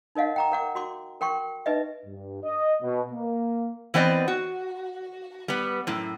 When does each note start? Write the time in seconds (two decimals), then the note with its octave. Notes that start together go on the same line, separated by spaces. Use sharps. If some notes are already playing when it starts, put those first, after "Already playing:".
0.15 D#4 A#4 D#5 F5 F#5
0.36 G5 A#5 D6
0.52 A#4 F#5 D6
0.75 F#4 C6 D6
1.21 A#4 G5 C6 C#6
1.66 D#4 B4 D#5 E5
2.06 G2
2.44 D#5
2.82 B2
3.12 A#3
3.94 E3 B3 C4 D5 D#5
4.28 F#4
5.48 G3 B3
5.87 F#2 A2